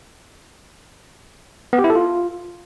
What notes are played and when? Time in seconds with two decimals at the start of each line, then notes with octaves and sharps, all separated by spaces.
1.73 B3
1.79 G4
1.84 E4
1.90 A4
1.95 F4